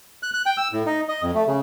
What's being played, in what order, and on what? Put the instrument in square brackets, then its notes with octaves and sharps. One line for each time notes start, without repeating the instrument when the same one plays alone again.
[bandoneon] F#6
F#6
G5
E6
A2
D#4
D#5
F2
A3
C#3